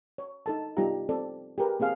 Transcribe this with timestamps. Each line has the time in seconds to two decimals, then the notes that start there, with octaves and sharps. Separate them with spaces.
0.18 C#5
0.46 D#4 A4 A5
0.77 G3 B3 D#4 F4 G4 A#5
1.09 C4 A4 D5
1.58 G4 G#4 A#4 B4
1.80 A#3 C4 G#4 F5